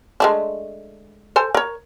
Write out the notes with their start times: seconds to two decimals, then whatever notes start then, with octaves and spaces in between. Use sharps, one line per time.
0.20 G#3 A3 D4
1.36 A4 C5 G#5
1.55 A#4 C#5